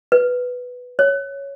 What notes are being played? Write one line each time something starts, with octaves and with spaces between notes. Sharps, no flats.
B4
C#5